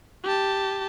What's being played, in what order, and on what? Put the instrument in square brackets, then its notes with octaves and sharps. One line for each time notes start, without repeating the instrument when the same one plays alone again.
[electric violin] G4 A5